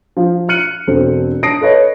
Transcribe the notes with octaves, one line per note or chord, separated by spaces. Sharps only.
F3
F6 F#6 C#7 D#7 F#7
E1 C4 A4
A5 D#6 A#6 C7 D7
A4 B4 C#5 D#5